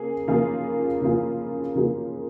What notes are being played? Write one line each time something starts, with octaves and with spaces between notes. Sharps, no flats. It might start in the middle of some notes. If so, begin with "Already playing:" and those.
Already playing: C#3 A#3 G#4
C#3 F3 A#3 F4 G#4
C#3 F3 A#3 F4 G#4
C#3 F3 A#3 F4 G#4